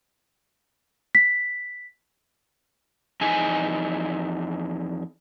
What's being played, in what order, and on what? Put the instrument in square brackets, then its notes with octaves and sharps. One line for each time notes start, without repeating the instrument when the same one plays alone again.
[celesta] B6
[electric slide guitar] F2 E3 D#4 G#4 G#5